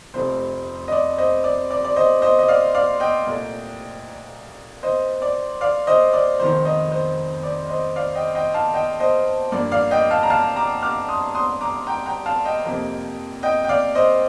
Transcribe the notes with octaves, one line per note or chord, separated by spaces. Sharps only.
F1 F2 C3 F3 A3 C5
D#5
D5
C5 D#5
D5
D5
D5
C5 D#5
C5 D#5
D#5
D5 F5
D5 F5
D#5 G5
C2 A#2 A3
C5 D#5
D5
D5 F5
C5 D#5
D5
F1 F2 D#3 C5
C5 D#5
C5
D5
C5 D#5
D5 F5
D#5 G5
D#5 G5
F5 A5
D#5 G5
C5 D#5
G2 F3 A#3 D5
D5 F5
D#5 G5
F5 A5
A#5
F5 A5
A#5 D6
D6 F6
C6 D#6
C6 D#6
A#5 D6
G5 A#5
G5 A#5
F5 A5
D#5 G5
F2 C3 F3 A#3
D#5 G5
G5
D5 F5
C5 D#5